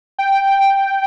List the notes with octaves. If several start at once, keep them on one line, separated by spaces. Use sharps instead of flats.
G5